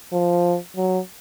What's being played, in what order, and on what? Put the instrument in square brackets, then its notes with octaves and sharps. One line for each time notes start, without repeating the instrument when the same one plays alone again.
[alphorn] F3
F#3